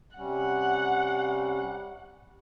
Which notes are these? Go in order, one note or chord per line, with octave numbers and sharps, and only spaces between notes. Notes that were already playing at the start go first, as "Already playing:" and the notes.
C3 G3 C#4 F#5